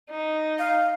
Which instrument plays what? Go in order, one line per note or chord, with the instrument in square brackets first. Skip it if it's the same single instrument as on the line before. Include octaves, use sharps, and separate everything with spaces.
[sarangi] D#4
[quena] F5